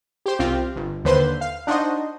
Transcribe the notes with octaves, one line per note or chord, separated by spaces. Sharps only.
G4 C5
C2 C4 F4 G4
G1
D#2 D3 B4 C5 C6
F5
D4 D#4 F#4 C5 D#5